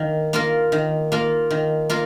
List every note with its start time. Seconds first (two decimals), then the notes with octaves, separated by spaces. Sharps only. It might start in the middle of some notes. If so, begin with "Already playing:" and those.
Already playing: D#3 A#3 A#4
0.33 A#3 F4 A#4
0.72 D#3
1.12 A#3 F4 A#4
1.51 D#3
1.89 A#3 F4 A#4